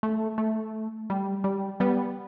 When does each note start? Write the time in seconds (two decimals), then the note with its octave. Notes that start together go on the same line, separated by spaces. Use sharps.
0.03 A3
0.38 A3
1.10 G3
1.44 G3
1.80 G3 B3